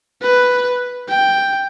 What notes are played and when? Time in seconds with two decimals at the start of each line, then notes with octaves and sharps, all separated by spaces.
0.22 B4
1.09 G5